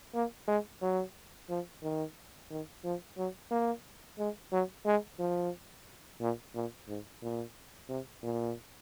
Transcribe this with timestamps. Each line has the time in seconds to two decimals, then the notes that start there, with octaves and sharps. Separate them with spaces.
0.14 A#3
0.48 G#3
0.82 F#3
1.49 F3
1.83 D#3
2.50 D#3
2.84 F3
3.17 F#3
3.51 A#3
4.18 G#3
4.52 F#3
4.86 G#3
5.19 F3
6.20 A#2
6.54 A#2
6.88 G#2
7.22 A#2
7.89 C3
8.22 A#2